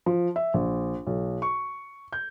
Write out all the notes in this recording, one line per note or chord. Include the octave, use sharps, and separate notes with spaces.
F3
E5
A#1
B1
C#6
G6